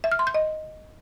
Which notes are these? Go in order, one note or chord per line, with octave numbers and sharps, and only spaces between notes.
E5
F6
C6
G6
D#5